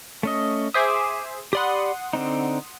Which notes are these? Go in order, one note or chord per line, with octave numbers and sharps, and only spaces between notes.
A3 C#4 D#5
G#4 C5 E5 D6 D#6
G4 D5 F#5 B5 C6 D#6
D3 C4 D#4